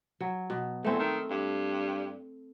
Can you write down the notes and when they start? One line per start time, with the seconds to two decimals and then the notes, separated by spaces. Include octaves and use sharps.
0.20 F#3
0.50 B2
0.85 E2 A3 C4
0.99 D#3
1.31 G2